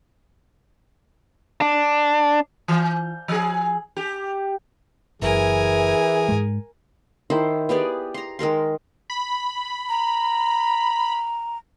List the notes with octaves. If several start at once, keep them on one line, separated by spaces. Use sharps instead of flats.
D4
E3
F3 G#4
G4
F#1 E3 G#4 A#4 G#5
G#2 G#3
D#3 E4 C5
B3 G4 G#4 D5
A#5 C6
D#3 G#3 A#4 C6
B5
A#5